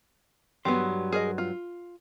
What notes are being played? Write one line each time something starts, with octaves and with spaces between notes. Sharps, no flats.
G2 F#3 B3 G4 C6
G#4 A#4 D#5
F4